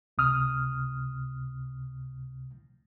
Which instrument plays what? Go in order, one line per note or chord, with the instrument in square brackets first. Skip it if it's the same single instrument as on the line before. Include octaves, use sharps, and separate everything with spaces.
[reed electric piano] C#2 C3 D#6 F6